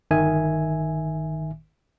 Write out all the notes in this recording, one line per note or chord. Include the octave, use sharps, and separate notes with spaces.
G1 D#3 E5 G#5